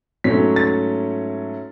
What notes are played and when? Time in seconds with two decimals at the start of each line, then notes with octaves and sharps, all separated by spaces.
0.24 G#2 F#3 A3 C#4 B6
0.56 A6